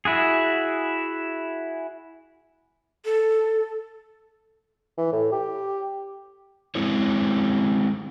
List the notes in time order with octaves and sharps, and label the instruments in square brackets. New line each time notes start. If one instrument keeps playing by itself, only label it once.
[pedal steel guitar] E4 F#4 G#4
[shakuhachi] A4
[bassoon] E3
A2
G4
[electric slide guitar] G#3 C4 E4 C#5